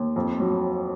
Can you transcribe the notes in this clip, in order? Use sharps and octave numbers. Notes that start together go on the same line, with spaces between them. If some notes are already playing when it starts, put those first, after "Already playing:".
Already playing: D#2
F2
F#3